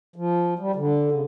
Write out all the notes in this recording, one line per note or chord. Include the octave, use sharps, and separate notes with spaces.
F3
G3
D3
C#3